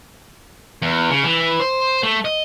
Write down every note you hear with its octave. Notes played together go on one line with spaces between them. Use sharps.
E2
C#3
E3
C5
A3
D#5